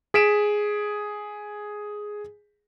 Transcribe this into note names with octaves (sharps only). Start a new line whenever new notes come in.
G#4 B6 D7 E7